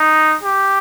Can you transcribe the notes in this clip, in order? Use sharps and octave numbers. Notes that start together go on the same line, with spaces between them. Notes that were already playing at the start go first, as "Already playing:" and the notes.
Already playing: D#4
G4